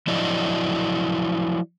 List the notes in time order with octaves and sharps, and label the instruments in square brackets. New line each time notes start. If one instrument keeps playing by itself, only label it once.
[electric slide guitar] F3 F#3 E4 D5 D#5